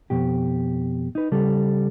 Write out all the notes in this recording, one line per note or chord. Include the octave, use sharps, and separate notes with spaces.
F2 B2 G4
D#4 B4
C#3 G3 A4